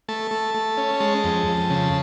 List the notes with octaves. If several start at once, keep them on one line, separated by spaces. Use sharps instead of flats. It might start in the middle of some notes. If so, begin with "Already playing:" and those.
A3 A5
A3
A3
C#4
G#3 A5
F2
F2
C#3